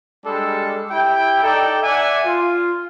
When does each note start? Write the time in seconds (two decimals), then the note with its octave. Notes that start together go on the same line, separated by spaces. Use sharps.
0.25 G3 G#3 D4 A4
0.91 E4 G4 G5
1.43 D#4 A4 D5 G5
1.82 D5 E5 F#5 G#5
2.25 F4